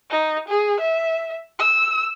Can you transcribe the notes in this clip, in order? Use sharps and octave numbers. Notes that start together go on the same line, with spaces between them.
D#4
G#4
E5
E6